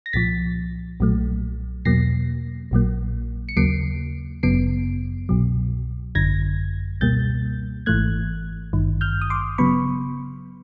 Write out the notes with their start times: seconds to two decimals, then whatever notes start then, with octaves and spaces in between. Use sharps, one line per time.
0.06 A#6
0.13 C2 A#2 F3 A6 B6
1.00 B1 A#2 F#3 A3
1.85 E2 B2 F#3 A#3 A#6 C7
2.71 A#1 A#2 F#3 A#3
3.49 C#7
3.57 D#2 C#3 F#3 A#3 C7 D7
4.43 G1 F#2 C#3 F#3 B3 C7 D7
5.29 C2 B2 F#3
6.15 G#1 F#2 D3 G#6 A#6
7.01 C#2 B2 G3 A#3 G6 A6
7.86 G#1 G#2 E3 A3 F#6 G#6
8.73 G#1 G2 D#3
9.01 F6 G6
9.21 D#6
9.30 C6 D6
9.58 C#3 F#3 B3 B5 C#6